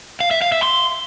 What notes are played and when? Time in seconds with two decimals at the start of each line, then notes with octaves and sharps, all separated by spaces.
0.20 F5
0.31 E5
0.42 F5
0.52 E5
0.63 C6